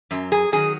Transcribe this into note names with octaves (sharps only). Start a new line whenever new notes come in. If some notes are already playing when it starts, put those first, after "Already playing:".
F#2 F#3
G#4
D#3 F#3 G#4